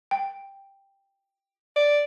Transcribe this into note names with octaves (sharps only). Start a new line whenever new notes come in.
G5
D5